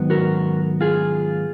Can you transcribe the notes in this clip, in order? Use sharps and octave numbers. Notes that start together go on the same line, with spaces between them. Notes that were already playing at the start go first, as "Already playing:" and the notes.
Already playing: G#2 D#3 F#3 B3
F#4 A#4
F4 G#4